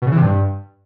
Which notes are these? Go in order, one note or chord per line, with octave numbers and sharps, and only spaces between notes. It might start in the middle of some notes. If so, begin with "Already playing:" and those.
B2
C#3
E3
C3
G2